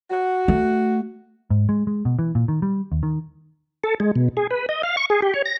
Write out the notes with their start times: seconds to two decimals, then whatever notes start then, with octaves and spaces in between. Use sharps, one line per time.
0.11 F#4
0.48 A3
1.50 G#2
1.69 G#3
1.87 G#3
2.05 B2
2.19 E3
2.35 A#2
2.48 D#3
2.62 G3
2.92 D#2
3.03 D#3
3.84 A4
4.00 G#3
4.15 B2
4.37 G#4
4.51 B4
4.69 D#5
4.83 F5
4.97 C#6
5.10 G#4
5.22 G4
5.34 C#5
5.46 A#6